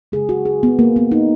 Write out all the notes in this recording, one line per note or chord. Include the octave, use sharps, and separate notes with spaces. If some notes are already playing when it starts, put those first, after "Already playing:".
C#3 G#3 G#4
F#4
G#4
B3
A#3
B3
D#4